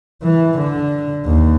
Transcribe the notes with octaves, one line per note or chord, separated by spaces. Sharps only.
E3
D3
D#2